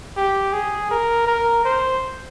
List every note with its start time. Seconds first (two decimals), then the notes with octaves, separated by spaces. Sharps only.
0.16 G4
0.53 G#4
0.91 A#4
1.27 A#4
1.65 C5